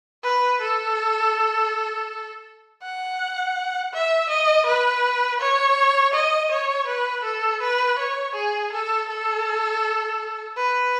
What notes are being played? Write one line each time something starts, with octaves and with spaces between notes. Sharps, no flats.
B4
A4
F#5
E5
D#5
B4
C#5
D#5
C#5
B4
A4
B4
C#5
G#4
A4
A4
B4